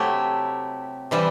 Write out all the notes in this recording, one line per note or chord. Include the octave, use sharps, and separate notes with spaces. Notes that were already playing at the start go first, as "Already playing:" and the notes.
Already playing: C3 F#3 A3 E4 G4
C3 E3 G3